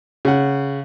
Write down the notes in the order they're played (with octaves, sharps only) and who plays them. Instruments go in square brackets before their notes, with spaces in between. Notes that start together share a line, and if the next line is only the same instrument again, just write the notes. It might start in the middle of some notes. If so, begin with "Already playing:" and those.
[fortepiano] C#3 F#5